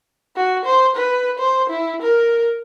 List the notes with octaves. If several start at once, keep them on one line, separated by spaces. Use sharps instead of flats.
F#4
C5
B4
C5
E4
A#4